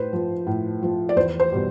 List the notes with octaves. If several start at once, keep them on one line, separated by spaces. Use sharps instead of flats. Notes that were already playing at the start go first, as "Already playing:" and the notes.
Already playing: A2 B4 C5
F3
A2
F3
D5
E2 C5
C5
B2 G3